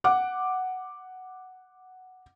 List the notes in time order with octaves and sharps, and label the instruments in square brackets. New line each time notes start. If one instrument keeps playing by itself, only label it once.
[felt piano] F#5 D6